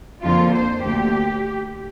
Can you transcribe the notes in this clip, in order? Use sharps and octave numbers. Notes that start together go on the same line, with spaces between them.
F2 D3 A#3 F4
C5
D2 D3 A#3 G4